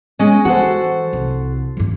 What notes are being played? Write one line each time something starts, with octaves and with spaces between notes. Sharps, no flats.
G#3 C#4 D#5
E3 F#4 A4 C5
C2
G#1 G2